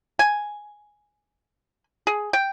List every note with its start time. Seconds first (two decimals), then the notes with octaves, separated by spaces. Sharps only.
0.19 G#5
2.07 G#4
2.33 G5